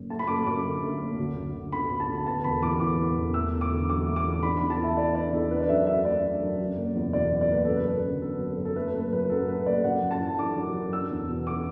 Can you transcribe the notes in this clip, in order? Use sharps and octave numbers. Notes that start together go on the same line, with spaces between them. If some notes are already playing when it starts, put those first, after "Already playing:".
Already playing: F#1
A3 A5
B5
F#1 D6
F#2 D6
D3
A3
F#1
D2
D2
D3
B3 B5
D2
A5
D2
B3 A5
E1 B5
E2 D6
E3 D6
B3
E1
A3 E6
E2
D6
D3
F#3 D6
A3
D6
E2
D4 B5
E2 B5
A5
E3 E5
B3 D5
D4 D5
E2 A4
D4 B4
D5
F#2 E5
F#3 E5
A3 D5
D4
F#2
F#3
F#1
E2
B2 D5
F#3
D5
F#1 B4
F#2 A4
B4
F#2
D3
B3 A4
F#2
F#2
A4
A3 B4
F#1 B4
F#2 B4
F#3 A4
A3 B4
F#1 D5
F#2 F#5
F#2
A5
E3
D4 D6
F#2
F#2
D4 E6
E2
B2
B3 D6